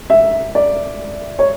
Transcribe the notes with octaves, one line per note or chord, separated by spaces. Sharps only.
E5
D5
C#5